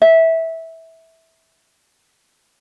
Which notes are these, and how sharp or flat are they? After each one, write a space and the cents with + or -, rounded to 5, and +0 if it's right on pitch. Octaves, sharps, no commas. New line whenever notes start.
E5 -15